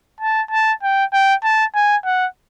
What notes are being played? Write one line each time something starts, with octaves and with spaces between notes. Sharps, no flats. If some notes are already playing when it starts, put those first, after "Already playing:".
A5
A5
G5
G5
A5
G#5
F#5